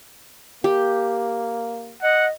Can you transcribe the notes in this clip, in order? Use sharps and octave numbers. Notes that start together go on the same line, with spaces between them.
A#3 G4
D#5 F#5